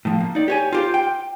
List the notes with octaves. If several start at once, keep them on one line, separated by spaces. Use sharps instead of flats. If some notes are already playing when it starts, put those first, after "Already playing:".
A2 F3
A#3
D#4 D5
G4 C#5 G#5
F4 G4 C5
G5